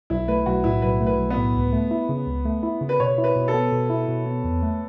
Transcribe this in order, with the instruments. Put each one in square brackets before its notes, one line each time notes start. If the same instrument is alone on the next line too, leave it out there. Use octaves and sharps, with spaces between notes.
[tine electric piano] B1 [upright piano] E4
[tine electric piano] A3 [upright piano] B4
[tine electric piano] B1 [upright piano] F#4
[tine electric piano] A2 [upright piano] E4
[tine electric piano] B1 [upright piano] B4
[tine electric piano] A3
[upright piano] B4
[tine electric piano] B1
[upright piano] B3
[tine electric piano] A2
C#2
A3
E4
C#3
C#2
A3
E4
C#3
[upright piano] B4
[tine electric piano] B2 [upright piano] C#5
[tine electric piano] E4
[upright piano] B4
[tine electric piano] B2
[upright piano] A4
[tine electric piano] B3
B2
E4
B2
B3
E2
A3